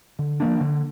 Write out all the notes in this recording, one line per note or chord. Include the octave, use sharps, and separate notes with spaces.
D3
F3 A#3 D4
D3